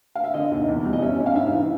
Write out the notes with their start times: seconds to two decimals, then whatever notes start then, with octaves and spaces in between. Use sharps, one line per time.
0.15 F5
0.24 E5
0.34 D3 D#5
0.51 D#2
0.68 E2
0.85 G3
0.93 D#5
1.02 C#4 E5
1.19 C#4
1.26 F5
1.35 G#2 E5
1.53 E3